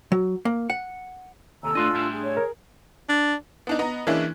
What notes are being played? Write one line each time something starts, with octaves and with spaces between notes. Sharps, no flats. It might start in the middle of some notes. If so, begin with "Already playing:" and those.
F#3
A#3
F#5
D#2 C3 A4 G#5 A#5 E6
A2 A3 D4 F4 D#5 C6 F#6
A2 G3 E4
G#4
C#5
A#4
D4
B3 D4 D#4
B3 D#5 A#5
E3 G#3 A#3 C#4 D4 E4